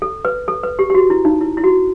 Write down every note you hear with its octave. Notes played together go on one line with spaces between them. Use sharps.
A4
B4
A4
B4
G4
G4
F#4
E4
D#4
E4
E4
F#4